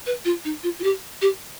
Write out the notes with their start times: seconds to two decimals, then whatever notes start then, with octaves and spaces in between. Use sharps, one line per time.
0.06 B4
0.25 F4
0.45 D#4
0.63 F4
0.79 F4
0.84 G4
1.22 G4